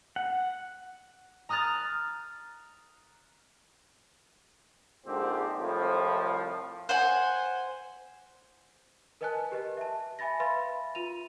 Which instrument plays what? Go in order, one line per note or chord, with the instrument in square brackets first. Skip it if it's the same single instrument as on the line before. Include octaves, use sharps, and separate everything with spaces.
[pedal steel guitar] F#5
[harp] A#5 D#6 F6 F#6 A6
[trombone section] A#1 G#2 D3 F3 C4 G4
C2 F2 A2 F3
[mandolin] C5 F#5 G#5
[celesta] A#4 B4 D#5 G#5 A5 F#6
G4 B4 D#5
E5 A5
E5 G#5 B5 A6 A#6
B4 E5 F5 B5 C6 A6
F4 D#7 F7